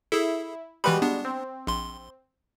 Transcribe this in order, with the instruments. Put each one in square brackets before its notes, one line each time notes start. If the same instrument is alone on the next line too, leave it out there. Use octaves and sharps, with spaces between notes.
[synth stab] E4 [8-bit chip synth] G#4 A4
[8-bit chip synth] E3 B4 B5 [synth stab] G3 G#3 F#4
[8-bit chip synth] B3 D4
[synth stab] C4
[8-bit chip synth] A#1 C6